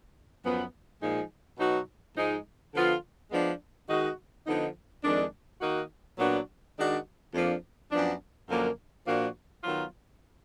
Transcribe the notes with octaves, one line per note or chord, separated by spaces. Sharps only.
F#2 F3 B3
A#2 F3 G#3 D#4 G#4
B2 F#3 B3 D#4 F#4
G#2 F3 G#3 D#4
D3 F3 B3 F4
F3 G#3 B3 D4
D#3 G#3 D#4 F#4
D3 F3 B3 D#4
F2 D#3 G#3 D4
D#3 A#3 D#4 F#4
A#2 F#3 B3 D4 F#4
D#3 G#3 D4 F#4
F2 F3 A#3 D4
F#2 F3 B3 D4
F#2 D3 F3 A#3
A#2 F3 A#3 D4 F#4
D#3 F#3 B3 F4